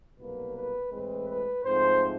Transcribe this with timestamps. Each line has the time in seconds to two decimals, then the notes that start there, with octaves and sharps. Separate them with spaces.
0.18 C2 B2 F#3 A#3 B4
0.55 B4
0.90 A2 E3 G#3 C4 B4
1.27 B4
1.63 G#2 F3 A3 C4 C5